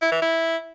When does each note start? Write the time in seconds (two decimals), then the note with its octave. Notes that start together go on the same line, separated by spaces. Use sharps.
0.02 E4
0.12 E3
0.22 E4